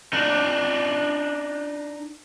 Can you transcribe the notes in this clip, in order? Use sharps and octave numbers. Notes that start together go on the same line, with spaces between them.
D4 D#4